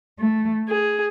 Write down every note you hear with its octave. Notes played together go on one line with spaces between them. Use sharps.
A3
G#4